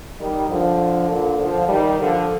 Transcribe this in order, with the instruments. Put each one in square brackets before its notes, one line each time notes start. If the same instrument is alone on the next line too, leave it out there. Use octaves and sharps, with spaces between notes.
[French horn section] D#3 G3
D3 F3
A#2 D3
D3 F3
D#3 G3
D3 F3